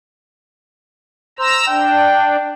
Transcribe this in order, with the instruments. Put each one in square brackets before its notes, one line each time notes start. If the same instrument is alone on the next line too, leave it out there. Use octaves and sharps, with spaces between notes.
[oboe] C5 [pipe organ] A#5 E6
[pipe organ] D4 [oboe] G5